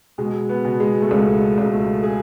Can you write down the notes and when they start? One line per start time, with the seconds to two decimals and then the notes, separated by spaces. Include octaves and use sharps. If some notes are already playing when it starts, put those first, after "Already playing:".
0.18 B2 G#3
0.49 B3
0.65 B2
0.80 G#3
1.02 A3
1.11 C#2 G#3
1.58 C#2
1.73 A3
2.03 G#4